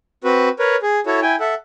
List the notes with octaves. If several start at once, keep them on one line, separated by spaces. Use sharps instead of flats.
C4 F#4 B4
A#4 B4 C#5
G#4
E4 F#4 A4 C#5
E4 G5 G#5
A4 E5 F#5